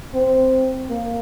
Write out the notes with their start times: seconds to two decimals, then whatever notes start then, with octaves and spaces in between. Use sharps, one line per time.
0.14 C4
0.90 A#3